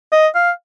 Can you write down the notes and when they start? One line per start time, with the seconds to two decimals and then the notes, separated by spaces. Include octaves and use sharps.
0.12 D#5
0.35 F5